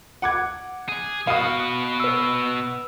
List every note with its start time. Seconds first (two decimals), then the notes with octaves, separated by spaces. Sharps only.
0.22 F#5 D6 G#6
0.89 G#4
1.27 B2 F#4 F5 D#6
2.00 B4 E6